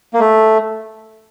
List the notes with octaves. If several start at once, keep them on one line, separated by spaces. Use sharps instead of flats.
A#3
A3